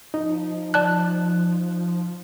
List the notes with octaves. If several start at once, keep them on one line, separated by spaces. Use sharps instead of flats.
F3 D#4
D5 A5 F#6